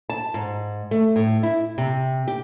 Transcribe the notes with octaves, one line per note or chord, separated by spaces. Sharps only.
A5
G#2
A3
A2
E4
C3
G4